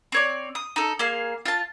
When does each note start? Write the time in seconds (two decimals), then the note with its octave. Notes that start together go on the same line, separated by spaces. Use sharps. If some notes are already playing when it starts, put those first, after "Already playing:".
0.12 C4 C#5 D5
0.55 D#6
0.76 D#4 A4
0.99 A#3 G#4 F5 C6
1.45 F4 A5